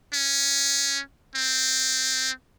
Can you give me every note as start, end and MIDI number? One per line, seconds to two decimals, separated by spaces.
0.13 1.00 61
1.35 2.30 60